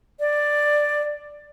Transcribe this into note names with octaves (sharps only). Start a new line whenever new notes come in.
D5